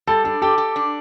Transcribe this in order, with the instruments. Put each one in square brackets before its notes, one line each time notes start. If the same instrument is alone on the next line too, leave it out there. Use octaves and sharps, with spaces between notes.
[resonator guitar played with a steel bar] G3 [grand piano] A4
[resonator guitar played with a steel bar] D4 [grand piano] A4
[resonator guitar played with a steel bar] G4 [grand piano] A4
[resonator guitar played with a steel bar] G4
D4